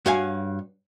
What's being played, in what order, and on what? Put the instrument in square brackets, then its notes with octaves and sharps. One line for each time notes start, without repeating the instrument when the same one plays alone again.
[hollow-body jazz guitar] G2 F#4 C#5 F5 G#5